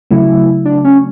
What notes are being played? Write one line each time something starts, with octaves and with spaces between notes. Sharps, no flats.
C#3 F#3 A3 E4
D4
C#4